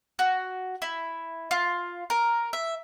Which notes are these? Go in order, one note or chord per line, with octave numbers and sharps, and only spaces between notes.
F#4
E4
F4
A#4
E5